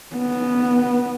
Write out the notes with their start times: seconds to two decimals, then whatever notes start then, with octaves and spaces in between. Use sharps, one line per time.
0.16 B3